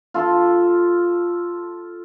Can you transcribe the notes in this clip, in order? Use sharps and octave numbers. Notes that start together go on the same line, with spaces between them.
F4 A4